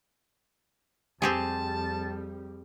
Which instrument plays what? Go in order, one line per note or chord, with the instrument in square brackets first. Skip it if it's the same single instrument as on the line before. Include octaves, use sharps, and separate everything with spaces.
[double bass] F2 G3 [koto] C4 G4 G#4 [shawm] A5